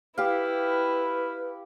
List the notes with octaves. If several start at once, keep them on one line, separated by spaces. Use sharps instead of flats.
E4 G4 B4 F5